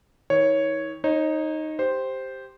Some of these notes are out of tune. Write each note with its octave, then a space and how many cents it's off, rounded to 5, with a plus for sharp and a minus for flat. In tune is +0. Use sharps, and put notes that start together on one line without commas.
D#3 +45 C#5 +0
D#4 +0 C#5 -35
G4 +0 C5 +0